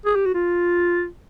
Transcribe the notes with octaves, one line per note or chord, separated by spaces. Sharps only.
G#4
G4
F#4
F4